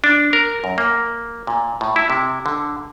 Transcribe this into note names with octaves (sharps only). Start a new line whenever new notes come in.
D4
A#4
F#2
A#3
A#2
A2
E4
C3
D3